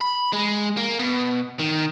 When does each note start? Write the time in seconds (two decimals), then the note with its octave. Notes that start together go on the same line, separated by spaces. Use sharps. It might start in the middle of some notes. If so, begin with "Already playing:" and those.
0.01 B5
0.33 G#3
0.77 A#3
0.99 B2
1.59 D#3